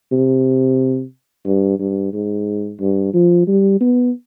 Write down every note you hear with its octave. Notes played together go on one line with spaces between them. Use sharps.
C3
G2
G2
G#2
G2
F3
G3
B3